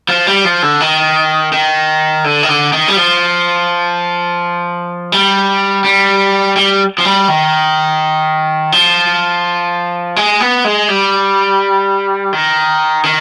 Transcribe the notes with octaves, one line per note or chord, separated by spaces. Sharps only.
F3
G3
F3
D3
D#3
D#3
D3
D#3
D3
D#3
G3
F3
G3
G3
G3
F3
G3
D#3
F3
G#3
B3
G#3
G3
D#3
D#3